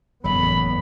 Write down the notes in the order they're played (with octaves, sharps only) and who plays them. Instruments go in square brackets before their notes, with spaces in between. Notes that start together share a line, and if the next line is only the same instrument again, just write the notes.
[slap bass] F#1 F#3 [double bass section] E2 A2 B3 [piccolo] B5